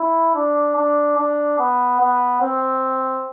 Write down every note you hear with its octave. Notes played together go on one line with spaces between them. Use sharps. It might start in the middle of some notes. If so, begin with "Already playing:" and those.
Already playing: E4
D4
D4
D4
B3
B3
C4